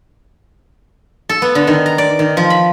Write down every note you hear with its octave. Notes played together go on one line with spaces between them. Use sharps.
A4
B3
D3
D#3
A#5
D5
D#3
F3
B5